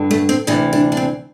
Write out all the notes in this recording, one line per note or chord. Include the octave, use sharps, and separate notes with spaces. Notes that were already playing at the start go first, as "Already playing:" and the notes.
Already playing: G2 D3
A3
C4
D2 C3 E3 D4
D4
D4
C4